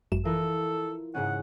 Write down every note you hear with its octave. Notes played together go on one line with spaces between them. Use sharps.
G#1 F#2 E7
E3 F4 A4 A#4
G#2 C#3 C#4 F#5